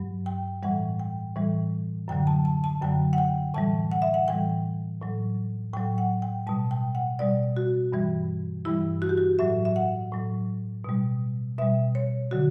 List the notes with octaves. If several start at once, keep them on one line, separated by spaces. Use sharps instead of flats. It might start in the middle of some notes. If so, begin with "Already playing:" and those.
Already playing: G2 F#3
G5
A2 E3 G3 F#5
G5
A2 E3 G3
F#2 D3 F#3 G5
A5
A5
A5
F#2 D3 F#3 G5
F#5
G5
A2 E3 G3 A5
F#5
E5
F#5
A2 E3 G3 G5
A2 F#3
A2 F#3 G5
F#5
G5
B2 G3 A5
G5
F#5
B2 G3 D5
F#4
G2 E3 G3
G2 E3 G3 E4
F#4
G4
F#4
A2 F#3 E5
E5
F#5
A2 F#3
B2 G3
B2 G3 E5
C#5
D3 F#3 F#4